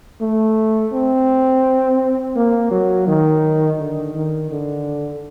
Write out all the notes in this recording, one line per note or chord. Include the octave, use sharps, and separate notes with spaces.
A3
C4
A#3
F#3
D#3
D3
D#3
D3